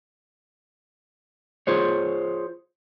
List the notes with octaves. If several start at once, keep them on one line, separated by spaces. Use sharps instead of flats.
F4 G#4 C5 C#5